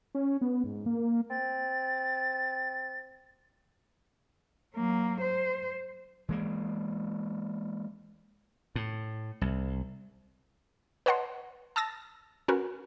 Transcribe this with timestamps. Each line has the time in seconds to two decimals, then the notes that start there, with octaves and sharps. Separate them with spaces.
0.15 C#4
0.41 B3
0.64 G#2
0.86 A#3
1.30 C4 A6
4.75 F#3 A#3
5.21 C5
6.29 E3 G#3 A#3
8.76 A2
9.41 C2
11.06 B4 C#5 D#5 F#5 A5 C6
11.76 A5 D#6 E6 A6 A#6
12.48 C#4 F#4 A#4 B4